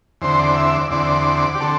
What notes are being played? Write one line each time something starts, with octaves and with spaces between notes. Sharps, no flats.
E2 D3 C4 C5
D5
E5
D5
E2 D3 C4 D5
G4
D3 C4 A4